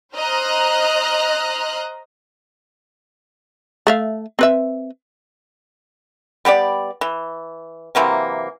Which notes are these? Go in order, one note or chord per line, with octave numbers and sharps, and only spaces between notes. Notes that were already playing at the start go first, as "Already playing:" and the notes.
C5 D#5 A#5 F6 F#6
A3 E5 F5
C4 B4 E5
G3 B3 G4 D5
E3
C3 E3 F#3 A#3